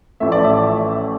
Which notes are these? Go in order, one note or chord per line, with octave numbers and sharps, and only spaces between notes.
A1 A2 F3 A3 E5
D5
E5